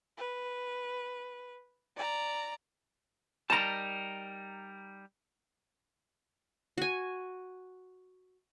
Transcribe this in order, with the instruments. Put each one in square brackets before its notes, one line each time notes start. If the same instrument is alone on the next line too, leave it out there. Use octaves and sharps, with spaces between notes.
[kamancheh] B4
D5 A#5
[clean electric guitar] G3 D#4 A#4 [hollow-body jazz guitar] A5 A#5
[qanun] F#4 G#5